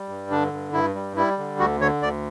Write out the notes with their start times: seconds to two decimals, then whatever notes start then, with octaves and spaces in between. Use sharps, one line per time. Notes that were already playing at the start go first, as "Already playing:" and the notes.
Already playing: G3
0.09 G2
0.31 D3 D4
0.53 G2
0.73 G2 E4
0.95 G3
1.16 G3 E4
1.38 D3
1.60 D2 F#4
1.80 D3 C#5
2.02 D2 D5